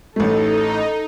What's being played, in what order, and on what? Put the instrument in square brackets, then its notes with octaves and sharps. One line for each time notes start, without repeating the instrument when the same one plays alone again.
[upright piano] A1 A3 [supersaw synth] D#4 [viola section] A4